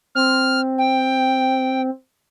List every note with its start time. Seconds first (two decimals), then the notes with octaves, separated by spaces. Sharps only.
0.15 C4 F6
0.78 G5